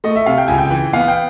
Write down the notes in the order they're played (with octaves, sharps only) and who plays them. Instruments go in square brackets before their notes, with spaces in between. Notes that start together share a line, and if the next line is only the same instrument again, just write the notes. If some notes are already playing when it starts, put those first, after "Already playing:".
[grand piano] A3 D#5
E5
C3 F5
G5
C#2 G#5
G5
E3
B3 F5
G5